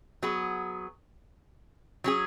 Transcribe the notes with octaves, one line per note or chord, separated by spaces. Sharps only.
F#3 B3 G#4
F#3 C#4 G#4